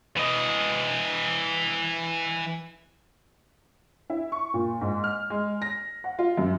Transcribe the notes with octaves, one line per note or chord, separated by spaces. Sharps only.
E3 D#5
E4
C#6
A#2
G#2
F6
G#3
A#6
F#5
F4
F#2